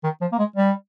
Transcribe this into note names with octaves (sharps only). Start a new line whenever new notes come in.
D#3
F3
A#3
G#3
G3